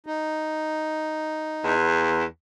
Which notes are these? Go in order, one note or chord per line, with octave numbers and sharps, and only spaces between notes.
D#4
E2